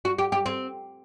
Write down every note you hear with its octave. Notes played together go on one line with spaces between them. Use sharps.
F#4
G4
G4
C4